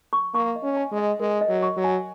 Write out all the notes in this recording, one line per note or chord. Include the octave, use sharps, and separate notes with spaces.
C#6
A#3 C#6
D#5
C#4
G#5
G#3
D#5
G#3 A#4
D#5
F#3
C#6
F#3
G#5